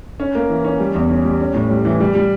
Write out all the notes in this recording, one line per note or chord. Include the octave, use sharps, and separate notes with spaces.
C#4
A#3
E3
C#4
G3
E2
C#4
G3
C#4
A2
G3
E3
G3
G3